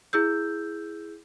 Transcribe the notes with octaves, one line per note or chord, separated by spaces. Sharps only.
E4 G#4 E6 G6